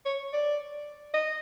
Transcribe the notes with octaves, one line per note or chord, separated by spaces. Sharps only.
C#5
D5
D#5